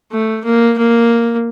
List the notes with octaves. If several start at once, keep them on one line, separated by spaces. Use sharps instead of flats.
A3
A#3
A#3